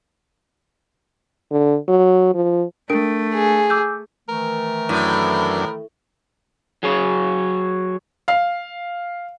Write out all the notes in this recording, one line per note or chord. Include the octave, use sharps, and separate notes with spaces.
D3
F#3
F3
A3 D4 A#4 D7
G#4
D6 E6 G6
D#3 E3 A3 A#4
F#2 A2 D4
F#3 G#4 C#5
F5